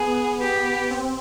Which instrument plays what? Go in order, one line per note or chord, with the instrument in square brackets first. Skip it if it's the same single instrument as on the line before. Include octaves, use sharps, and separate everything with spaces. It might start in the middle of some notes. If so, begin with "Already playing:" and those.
Already playing: [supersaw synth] B3 [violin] G#4
[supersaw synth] B3 [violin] G4
[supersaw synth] C4